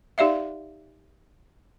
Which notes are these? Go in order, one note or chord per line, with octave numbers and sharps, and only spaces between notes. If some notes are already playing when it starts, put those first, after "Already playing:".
D#4 G4 D5 E5 F5